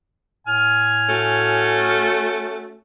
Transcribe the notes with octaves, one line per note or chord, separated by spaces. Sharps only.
A2 G#5 F6
A3 C#4 F#4